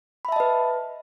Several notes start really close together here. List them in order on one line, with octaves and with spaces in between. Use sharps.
B5 E5 A5 D#5 B4